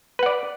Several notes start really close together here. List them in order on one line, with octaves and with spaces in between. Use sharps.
B4 F#5 D5